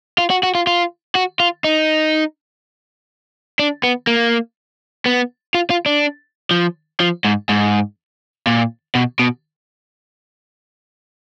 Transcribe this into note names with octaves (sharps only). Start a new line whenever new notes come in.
F4
F#4
F#4
F4
F4
F#4
F4
D#4
D4
B3
A#3
B3
F4
F4
D4
F3
F3
G#2
G#2
A#2
B2
B2